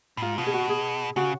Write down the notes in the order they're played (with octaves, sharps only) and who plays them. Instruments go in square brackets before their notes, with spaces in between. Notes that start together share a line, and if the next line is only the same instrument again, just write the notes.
[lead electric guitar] A2
[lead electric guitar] G#2 [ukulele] F4
[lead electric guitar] B2 [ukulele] F4
[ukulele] G#4
F#4
G#4
[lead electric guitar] C#3 [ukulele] F#4